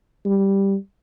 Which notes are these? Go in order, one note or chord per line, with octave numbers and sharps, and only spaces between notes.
G3